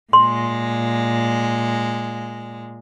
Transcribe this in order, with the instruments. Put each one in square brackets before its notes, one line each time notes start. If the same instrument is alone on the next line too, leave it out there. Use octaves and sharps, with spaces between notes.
[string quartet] A#2 G#3 [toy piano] C6